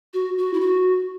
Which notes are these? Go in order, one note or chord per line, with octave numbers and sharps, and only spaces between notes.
F#4
F#4
E4
F#4